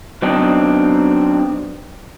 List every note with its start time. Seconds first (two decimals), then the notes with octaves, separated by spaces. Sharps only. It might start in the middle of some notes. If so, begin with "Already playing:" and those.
0.22 F#3 B3 C4 D4 D#4